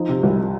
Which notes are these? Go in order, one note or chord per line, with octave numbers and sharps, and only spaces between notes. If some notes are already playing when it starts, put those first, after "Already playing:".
Already playing: F3 D#4
C3
C2